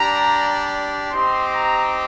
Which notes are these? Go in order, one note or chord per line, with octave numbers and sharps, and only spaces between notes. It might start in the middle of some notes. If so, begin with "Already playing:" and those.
Already playing: G3 D4 G4 A#5
C4 D#4 G4 C6
A#5